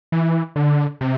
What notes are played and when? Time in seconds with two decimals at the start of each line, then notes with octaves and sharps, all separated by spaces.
0.12 E3
0.56 D3
1.01 C3